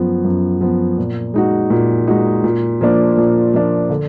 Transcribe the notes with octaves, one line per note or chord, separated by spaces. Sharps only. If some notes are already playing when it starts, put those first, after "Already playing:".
Already playing: F#2 F3 B3
F#2
F3 B3
A#2
G#3 D#4 F#4
A#2
G#3 D#4 F#4
A#2
F3 A#3 D4
A#2
F3 A#3 D4
D3